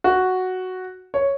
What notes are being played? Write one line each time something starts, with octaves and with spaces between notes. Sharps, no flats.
F#4
C#5